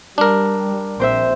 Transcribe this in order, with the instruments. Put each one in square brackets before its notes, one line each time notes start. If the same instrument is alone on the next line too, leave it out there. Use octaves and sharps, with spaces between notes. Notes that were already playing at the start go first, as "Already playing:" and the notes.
[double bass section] G3 [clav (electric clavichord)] D4 A#4
[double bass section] A#1 [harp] C4 C5 E5